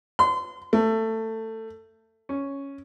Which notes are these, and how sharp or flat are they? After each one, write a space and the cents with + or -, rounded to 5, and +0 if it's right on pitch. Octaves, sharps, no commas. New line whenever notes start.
C6 -30
A3 +20
C#4 +0